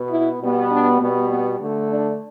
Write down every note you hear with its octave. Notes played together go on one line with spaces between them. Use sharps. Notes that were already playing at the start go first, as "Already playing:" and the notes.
Already playing: B2 B3
E4
B2 G3 B3
D4
B2 G3 B3
B3
D3 A3
D4